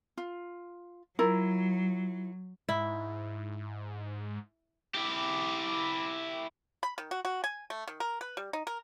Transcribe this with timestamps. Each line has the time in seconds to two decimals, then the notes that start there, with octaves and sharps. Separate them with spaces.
0.17 F4
1.19 F#3 E4 F4 A#4
2.69 G#2 E4
4.94 E4 G4
6.83 B5
6.98 D#3
7.11 F#4
7.25 F#4
7.44 G#5
7.70 A3
7.88 D#3
8.00 A#4
8.21 B4
8.37 G3
8.53 D#4
8.67 A#4